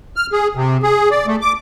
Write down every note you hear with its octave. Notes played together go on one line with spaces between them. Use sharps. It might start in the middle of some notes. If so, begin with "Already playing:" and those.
F6
G#4
C3
G#4
D5
A3
D6